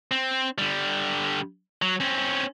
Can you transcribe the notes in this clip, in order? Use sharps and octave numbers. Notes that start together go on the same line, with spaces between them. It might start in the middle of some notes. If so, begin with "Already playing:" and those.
C4
D3 G3
F#3
C4 C#4